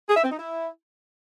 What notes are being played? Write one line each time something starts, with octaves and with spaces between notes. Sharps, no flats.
G#4
E5
C4
D#4
E4